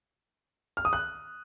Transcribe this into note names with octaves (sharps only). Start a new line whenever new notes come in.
F6
D#6
F#6